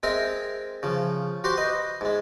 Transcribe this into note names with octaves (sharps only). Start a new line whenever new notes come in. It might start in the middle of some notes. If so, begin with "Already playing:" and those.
G#3 C4 A#4 E5 G#5
C#3 F3
F#4 G4 C5 C6 D6
B4 D#5
G#2 G#3